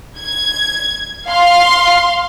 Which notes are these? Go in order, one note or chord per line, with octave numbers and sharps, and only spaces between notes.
G#6
F5 C6